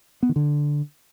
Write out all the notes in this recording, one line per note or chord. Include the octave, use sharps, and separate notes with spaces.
B3
D#3
D3